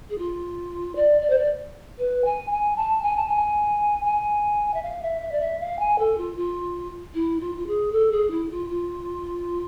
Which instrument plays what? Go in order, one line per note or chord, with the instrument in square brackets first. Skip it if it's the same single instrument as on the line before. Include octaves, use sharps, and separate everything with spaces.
[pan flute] G#4
F4
D5
D5
C5
D5
B4
G#5
G#5
A5
G#5
A5
G#5
G#5
E5
F5
E5
E5
D5
E5
F5
G#5
A4
F4
F4
E4
F4
F4
G#4
A4
G#4
E4
F4
F4